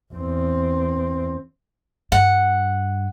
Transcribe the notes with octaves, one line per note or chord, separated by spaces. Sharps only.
E2 C4
G2 F#5